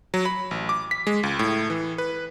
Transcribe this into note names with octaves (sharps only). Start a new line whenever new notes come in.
F#3
B5
A1
D6
B6
G#3
C#2
A2
E3
B4